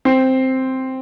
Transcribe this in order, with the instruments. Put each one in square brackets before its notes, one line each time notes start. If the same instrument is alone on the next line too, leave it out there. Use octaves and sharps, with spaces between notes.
[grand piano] C4